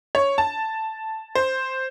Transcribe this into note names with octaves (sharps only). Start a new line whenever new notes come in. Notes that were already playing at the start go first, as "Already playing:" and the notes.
C#5
A5
C5